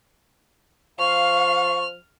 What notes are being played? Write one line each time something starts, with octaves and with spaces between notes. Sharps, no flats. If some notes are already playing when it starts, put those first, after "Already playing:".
F3 F5 C#6 F6